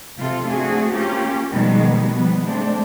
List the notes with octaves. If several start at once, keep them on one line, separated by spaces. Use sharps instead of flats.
C3 F4 A4
A3 C4 D4 F#4 G#4
A#3 C#4 F4 G4
B2 D#3 F3 G3 G#3 B3
F3 G3 B3
G#3 A3 C4 D4